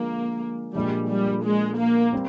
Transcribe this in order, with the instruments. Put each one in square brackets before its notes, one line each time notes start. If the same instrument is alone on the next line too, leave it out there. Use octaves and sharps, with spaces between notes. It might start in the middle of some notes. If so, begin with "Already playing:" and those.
Already playing: [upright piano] D3 F3 G#3 [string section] A#3
[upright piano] A#2 F3 G#3 D4 [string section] G3
[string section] G3
G#3
A#3
[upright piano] G3 C4